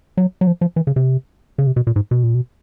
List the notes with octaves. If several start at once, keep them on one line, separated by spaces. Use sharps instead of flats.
F#3
F#3
F3
F3
E3
C#3
C3
C#3
C3
B2
A#2
G#2
B2
A#2
B2